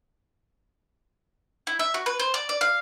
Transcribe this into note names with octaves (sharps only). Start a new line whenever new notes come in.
E4
E5
F#4
B4
C5
D5
D5
F5